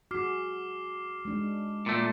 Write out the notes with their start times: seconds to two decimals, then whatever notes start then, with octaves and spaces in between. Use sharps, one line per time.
0.11 F#4 G#4 D6 F6 C7
1.25 G#3 D4
1.86 A#2 A3